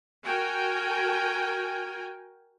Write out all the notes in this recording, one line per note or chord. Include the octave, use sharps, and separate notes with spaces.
F#4 A#4 G5 G#5